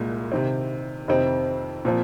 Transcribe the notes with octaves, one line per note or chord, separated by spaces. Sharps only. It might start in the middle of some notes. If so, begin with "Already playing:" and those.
Already playing: C2 A#2 G#3
C3 D#3 C4
F2 C3 D#3 C4 D#4
A#2 F3 C4